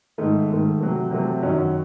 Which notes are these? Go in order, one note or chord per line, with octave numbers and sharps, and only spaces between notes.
G#2 D#3 A3
G#2 D#3 A3
C3 F#3 A3 C4
C3 F#3 A3 C4
F#2 D#3 F#3 C#4